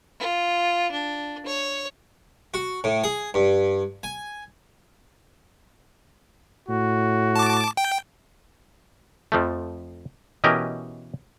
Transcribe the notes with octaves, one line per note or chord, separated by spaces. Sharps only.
F4
D4
C#5
F#4
A2
G#4
G2
G#5
A2 F#4
A5 D6
G5
F2 F3 A3
B2 E3 C#4 G4 A#4 D#5